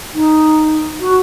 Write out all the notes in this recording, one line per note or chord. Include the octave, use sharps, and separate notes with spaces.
D#4
F#4